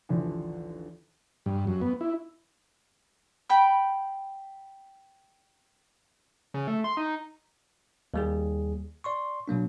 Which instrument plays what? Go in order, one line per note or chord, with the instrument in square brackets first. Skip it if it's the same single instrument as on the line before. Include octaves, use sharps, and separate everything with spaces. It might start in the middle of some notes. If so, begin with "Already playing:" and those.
[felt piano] A1 D#2 D3 E3 F3
[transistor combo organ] G2
F#2
B3
E4
[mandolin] G5 B5 G6
[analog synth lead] C#3
A3
C6
D#4
[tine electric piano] D#2 G3 G#4
D5 C6 C#6
B2 F#3 A#3 D4